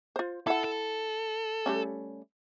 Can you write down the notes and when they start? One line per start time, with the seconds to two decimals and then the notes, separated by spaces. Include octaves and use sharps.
0.16 F4 C5
0.47 E4 A4 F#5
0.64 A4
1.66 G3 A3 C#4